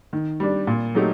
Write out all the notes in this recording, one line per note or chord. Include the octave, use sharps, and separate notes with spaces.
D#3
G3 D4
A#2
F#3 A3 D#4 G4